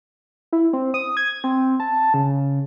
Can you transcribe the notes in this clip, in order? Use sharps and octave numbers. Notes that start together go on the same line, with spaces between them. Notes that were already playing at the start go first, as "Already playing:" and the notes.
E4
C4
D#6
G#6
C4
A5
C#3